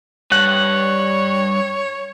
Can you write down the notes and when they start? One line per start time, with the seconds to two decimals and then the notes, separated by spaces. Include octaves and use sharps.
0.32 G2 C#5 F#5